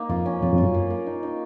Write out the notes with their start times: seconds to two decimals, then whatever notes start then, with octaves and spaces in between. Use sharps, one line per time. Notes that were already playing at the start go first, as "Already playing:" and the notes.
Already playing: A#3 D#4
0.09 F2 F4
0.26 C#4
0.42 F2 F4
0.53 F2
0.58 F#2 F4
0.74 A#3
0.90 A#3
1.06 D#4
1.23 D#4